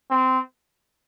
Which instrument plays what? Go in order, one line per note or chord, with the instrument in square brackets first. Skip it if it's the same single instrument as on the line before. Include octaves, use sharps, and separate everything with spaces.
[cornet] C4